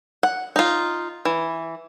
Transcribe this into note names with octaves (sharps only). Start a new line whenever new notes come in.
F#5
D#4 F4
E3